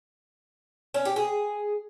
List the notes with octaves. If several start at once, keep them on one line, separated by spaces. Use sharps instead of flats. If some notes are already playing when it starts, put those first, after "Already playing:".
C#4
G4
G#4